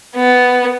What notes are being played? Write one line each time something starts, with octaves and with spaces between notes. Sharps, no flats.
B3